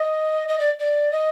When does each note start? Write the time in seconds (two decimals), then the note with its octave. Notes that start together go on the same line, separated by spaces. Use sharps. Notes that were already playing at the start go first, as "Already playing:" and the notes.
Already playing: D#5
0.48 D#5
0.59 D5
0.79 D5
1.11 D#5